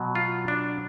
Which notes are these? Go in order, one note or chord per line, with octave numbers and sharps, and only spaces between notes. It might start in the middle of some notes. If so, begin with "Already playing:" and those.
Already playing: B2 F#3
F4
D4